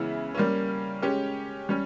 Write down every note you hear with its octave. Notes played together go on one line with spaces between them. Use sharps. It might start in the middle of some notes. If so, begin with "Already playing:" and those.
Already playing: C#3 E3 G#3 B3 E4
G3 A#3 C#4
G#3 C#4 G4
G3 C#4